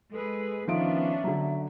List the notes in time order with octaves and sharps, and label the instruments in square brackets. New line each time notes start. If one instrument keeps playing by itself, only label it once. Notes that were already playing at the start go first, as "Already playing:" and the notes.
[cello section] G#3 G#4 B4 [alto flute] A4
[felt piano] D#3 F3 D7 [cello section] B3 C#4 D4 [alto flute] E5
[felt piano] D3 F#3